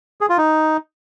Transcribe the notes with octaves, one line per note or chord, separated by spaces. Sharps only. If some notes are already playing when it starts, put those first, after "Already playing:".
G#4
F4
D#4